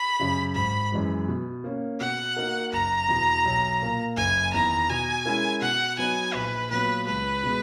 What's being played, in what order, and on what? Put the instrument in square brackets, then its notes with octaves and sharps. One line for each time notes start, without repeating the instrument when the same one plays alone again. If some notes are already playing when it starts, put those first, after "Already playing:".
Already playing: [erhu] B5
[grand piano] F#2 C#3
[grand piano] G#1 [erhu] B5
[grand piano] F#2 E3 G#3
B2
A#3 C#4
[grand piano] B2 [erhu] F#5
[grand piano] A#3 D#4 F#4 A#4
[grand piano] F#1 [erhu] A#5
[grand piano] E2 B2
B1
A#2 A#3
[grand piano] F#1 [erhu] G#5
[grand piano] E2 D#3 [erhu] A#5
[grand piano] B2 [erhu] G#5
[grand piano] G#3 C#4 E4 A#4
[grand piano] B2 [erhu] F#5
[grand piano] F#3 B3 D#4 [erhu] G#5
[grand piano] A#1 [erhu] B4
[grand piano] A#2 F#3 B3 [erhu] B4
[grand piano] C#2 [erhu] B4
[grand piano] B2 G#3 B3